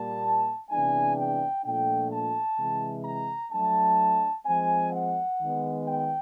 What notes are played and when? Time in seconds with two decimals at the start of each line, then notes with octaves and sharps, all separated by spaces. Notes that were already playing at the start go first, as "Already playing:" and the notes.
Already playing: A#2 G3 A#3 A5
0.70 C3 E3 G#3 B3 D4 G#5
1.16 G5
1.64 A#2 F3 A3 D4 G5
2.11 A5
2.58 C3 E3 G#3
3.04 A#5
3.51 F#3 A3 D4 A5
4.46 F3 G#3 C4 G#5
4.92 F#5
5.39 D#3 G#3 B3
5.86 G5